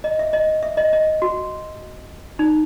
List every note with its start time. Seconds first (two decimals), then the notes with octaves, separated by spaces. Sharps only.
0.04 D#5
0.19 E5
0.33 D#5
0.63 E5
0.77 D#5
0.93 D#5
1.22 F#4
2.39 D#4